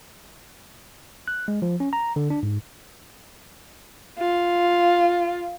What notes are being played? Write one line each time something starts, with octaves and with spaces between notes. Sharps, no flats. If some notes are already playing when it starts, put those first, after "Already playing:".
F#6
G#3
F3
C#4
A#5
D3
D4
G#2
F4